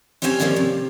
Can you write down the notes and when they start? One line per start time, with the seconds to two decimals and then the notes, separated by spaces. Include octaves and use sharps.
0.22 C4 C#4 G4 C5 D5 G#5
0.40 D#3 F3 G3 A#3 C4 C#4
0.56 C3